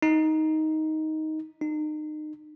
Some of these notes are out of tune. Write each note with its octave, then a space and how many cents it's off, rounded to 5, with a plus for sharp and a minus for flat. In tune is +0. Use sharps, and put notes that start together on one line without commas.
D#4 +10
D#4 -30